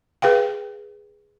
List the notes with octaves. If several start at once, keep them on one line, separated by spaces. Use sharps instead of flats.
G#4 B4 F5 G5